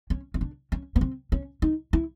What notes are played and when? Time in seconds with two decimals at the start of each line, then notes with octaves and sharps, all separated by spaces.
0.10 C#4
0.34 C#4
0.41 D4
0.72 C#4
0.96 B3
1.01 C4
1.32 C#4
1.62 D#4
1.93 E4